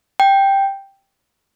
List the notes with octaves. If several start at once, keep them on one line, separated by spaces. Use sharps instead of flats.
G5